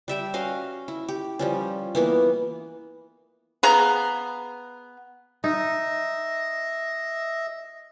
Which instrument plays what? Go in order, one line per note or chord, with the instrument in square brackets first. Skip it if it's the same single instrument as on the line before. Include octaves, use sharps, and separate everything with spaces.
[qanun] G3 E5 G5
C#4 F#4 D#5 F5
E4
G4
F3 G3 C#4
E3 A#3 B3
[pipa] B3 G#4 F5 A#5
[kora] D#4 [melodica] D#5 E5